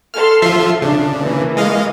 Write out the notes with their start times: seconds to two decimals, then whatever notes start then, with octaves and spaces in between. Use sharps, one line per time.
0.14 A4 C6 F6
0.42 F3 F4 E5
0.82 C#3 D4
1.22 E3 A#3
1.57 G#3 D#5 F5